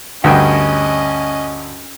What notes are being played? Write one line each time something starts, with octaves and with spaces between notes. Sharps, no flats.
D2 G2 C#4 D#5 G5